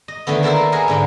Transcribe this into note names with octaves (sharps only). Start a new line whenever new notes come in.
D#5
D3 D#3 A3 B3
A#3 E4 A4 A#4 C5 E5
G#4 A#4 B4 D#5 E5 F#5
G#2 D3 F#5